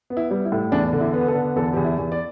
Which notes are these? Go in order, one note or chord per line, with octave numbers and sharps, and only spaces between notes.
B3
E4
G3
E4
A2
E2 D4
D3
E4
B3
B4
A4
D3
E2 A4
E2 G4
E4
E2
D5